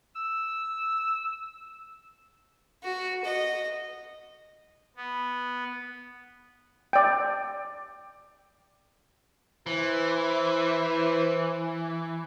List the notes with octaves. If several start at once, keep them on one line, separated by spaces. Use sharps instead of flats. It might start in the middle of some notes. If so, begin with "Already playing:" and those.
E6
F#4
D#5
B3
D5 G5
E3 E4 B4 C5